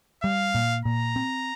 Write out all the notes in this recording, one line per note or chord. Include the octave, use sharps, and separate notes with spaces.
G3 F5
A#2
A#2 A#5
C4